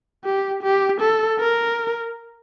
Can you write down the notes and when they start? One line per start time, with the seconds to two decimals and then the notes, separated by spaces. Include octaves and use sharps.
0.25 G4
0.63 G4
1.00 A4
1.39 A#4